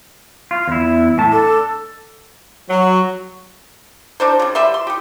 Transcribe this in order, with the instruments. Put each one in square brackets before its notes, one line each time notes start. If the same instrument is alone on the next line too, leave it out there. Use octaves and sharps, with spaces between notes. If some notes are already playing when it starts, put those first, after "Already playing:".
[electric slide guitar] F4
E2 E4
A2 A5
[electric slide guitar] D4 [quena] A4
[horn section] F#3
[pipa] D4 D#4 A4 C5
C#3 G3
G3 B4 E5 C6
C6
D#4 G4